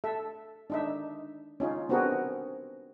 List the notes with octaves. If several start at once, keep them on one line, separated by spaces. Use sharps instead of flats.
A4 E5
D4 D#4 E5
C#4 D#4 F4
B3 C4 D4 F#4 G#4 A#4